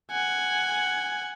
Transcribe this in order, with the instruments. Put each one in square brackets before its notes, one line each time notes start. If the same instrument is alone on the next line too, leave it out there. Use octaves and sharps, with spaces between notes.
[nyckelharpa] F#5 [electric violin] G#5